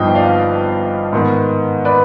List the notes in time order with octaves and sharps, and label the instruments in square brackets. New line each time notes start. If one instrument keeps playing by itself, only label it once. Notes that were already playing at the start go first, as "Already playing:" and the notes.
Already playing: [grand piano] G1 G2 F3 B3 D#4 D#5 G5
D5 F5
G#2 D#3 B3
B4 D5